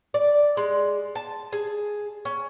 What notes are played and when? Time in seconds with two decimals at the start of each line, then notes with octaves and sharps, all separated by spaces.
0.14 D5
0.57 G#3
1.15 A5
1.53 G#4
2.25 C#4